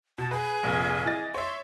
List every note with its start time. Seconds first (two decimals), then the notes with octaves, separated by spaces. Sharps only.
0.18 B2 A5
0.31 G#4 B4
0.63 F1 A#1
1.06 E3 D#5 A6
1.34 C#5 E5 C6